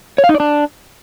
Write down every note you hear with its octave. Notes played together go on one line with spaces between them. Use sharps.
C#5
F5
D#4
D5
D4